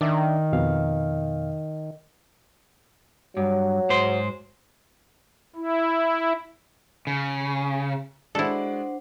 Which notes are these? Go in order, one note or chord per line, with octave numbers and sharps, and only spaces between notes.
D#3 D4 D5 E5
F2 B2 F5
G2 F#3
G#2 C5 C6
E4
C#3
G#3 D4 E4 F#4 A4 C5 D5 F#5